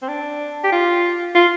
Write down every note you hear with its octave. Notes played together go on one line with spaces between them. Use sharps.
C4
D4
G4
F4
F4